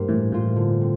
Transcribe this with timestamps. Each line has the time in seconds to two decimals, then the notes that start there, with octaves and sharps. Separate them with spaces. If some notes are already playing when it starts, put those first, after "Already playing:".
Already playing: G2 A#3 D4 G4 C5
0.08 A2 E3
0.32 A2 A#3 F4 C5
0.56 D3
0.81 C4